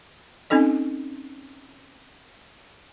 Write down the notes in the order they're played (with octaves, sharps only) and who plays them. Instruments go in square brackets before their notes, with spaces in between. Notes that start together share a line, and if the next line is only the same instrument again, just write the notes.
[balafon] C4 C#4 D#4 A4 D#5